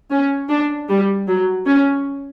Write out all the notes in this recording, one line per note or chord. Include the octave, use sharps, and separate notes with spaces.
C#4
D4
G3
F#3
C#4